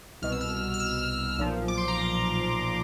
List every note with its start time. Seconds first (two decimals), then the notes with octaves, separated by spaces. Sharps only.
0.22 C2 B2 F6
0.32 E6
0.41 F6
0.74 F6
0.80 E6
1.38 B1 A#2 F3
1.68 D6
1.78 C6
1.88 A#5